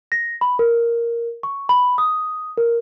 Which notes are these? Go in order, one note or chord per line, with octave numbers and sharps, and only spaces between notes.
A#6
B5
A#4
C#6
B5
D#6
A#4